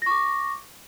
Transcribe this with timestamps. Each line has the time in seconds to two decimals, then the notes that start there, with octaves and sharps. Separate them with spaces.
0.02 A#6
0.06 C#6
0.11 D6